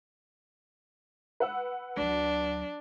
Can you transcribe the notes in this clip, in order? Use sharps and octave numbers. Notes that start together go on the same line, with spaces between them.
B4 F#5 E6
D2 F#3 D4